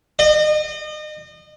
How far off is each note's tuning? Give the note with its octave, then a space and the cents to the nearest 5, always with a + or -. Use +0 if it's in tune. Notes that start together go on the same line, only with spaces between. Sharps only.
D#5 -35